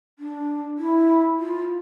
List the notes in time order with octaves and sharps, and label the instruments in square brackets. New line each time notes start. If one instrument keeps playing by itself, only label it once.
[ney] D4
E4
F4